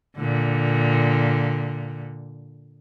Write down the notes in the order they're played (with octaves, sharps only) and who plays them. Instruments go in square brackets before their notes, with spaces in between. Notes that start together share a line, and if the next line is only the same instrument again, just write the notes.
[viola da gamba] A#2 D3